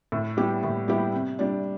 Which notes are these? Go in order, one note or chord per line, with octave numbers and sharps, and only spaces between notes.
A2
G3 B3 E4 G4
A2
G3 B3 E4 G4
C3
G3 D4